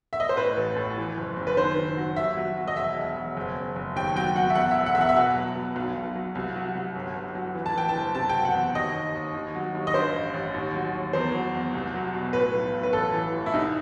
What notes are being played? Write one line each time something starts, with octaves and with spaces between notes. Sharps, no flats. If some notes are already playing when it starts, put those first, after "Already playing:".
E5
D#5
C5
A2 B4
A1
A2
E3
F#1
F#1
B4
D#3 C5
D#3
F#3
D#2 E5
F#3
F#3
D#5
E1 E5
E1
E1
F#1
F#1
F#1
D#2 G5
F#3 G5
F#3 F#5
E5
E2 F#5
E1 E5
F#5
E2 E5
F#5
E5
B2 F#5
F#3
B2
B1
B1
F#3
C2
F#3
C2
G1
G1
F#3
E3
A5
E3 G5
A5
F#1
C3 A5
G5
F#3
F#5
E2
D#2 D#5
D#2
D#2
D#2
F#3
D#2
D#5
G2 C5
A1
A1
D#2
F#3
D#2
E2 C5
F#3
E2
C2
F#3
B2
A2 B4
B1
B1
B4
A1 A4
E3
A2
E4
C2 D#4